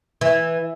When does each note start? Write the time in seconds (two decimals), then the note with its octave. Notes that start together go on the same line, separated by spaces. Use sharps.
0.21 E3